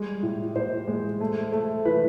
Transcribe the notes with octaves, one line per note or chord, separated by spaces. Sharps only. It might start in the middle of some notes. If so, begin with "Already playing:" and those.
Already playing: G3 G#3
A2
A2 C5
G#3
A3
A3
E3 B4